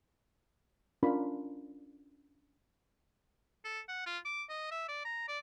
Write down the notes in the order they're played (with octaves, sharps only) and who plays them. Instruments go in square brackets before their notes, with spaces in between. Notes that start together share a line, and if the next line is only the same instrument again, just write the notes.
[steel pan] C#4 D4 F4 A#4 B5
[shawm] A4
F#5
F4
D6
D#5
E5
D5
A#5
D5